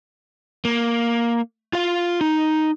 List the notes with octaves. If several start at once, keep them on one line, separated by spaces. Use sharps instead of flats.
A#3
F4 F5
D#4